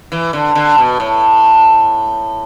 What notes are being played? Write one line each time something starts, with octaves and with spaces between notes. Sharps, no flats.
E3
D3
D3
B2
A2